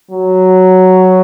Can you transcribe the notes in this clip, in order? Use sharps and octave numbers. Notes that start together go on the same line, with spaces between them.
F#3